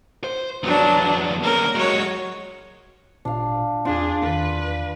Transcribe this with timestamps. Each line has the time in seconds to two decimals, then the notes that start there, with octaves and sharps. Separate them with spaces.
0.24 C5
0.63 F2 F#3 B3 D4
1.43 A#3 C#4 A#4
1.75 F#3 G#3 F#4 C#5
3.25 G#1 A#2 D4 F4 F5
3.85 E2 C4 D4 F4 G#4
4.23 E2 D#3 B4